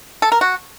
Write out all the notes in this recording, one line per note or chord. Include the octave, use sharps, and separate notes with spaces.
A4
A#4
F#4